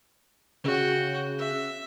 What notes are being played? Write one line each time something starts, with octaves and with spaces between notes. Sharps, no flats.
C#3 F#4 G5
E5